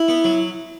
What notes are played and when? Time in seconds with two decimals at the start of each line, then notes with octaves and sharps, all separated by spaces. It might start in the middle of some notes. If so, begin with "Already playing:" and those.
Already playing: E4
0.08 B3
0.24 F#3